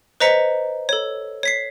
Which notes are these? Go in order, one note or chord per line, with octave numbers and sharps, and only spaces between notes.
B4 C5 D#5 A#5 B6 C#7
A4 C#5
C#5 B6 C7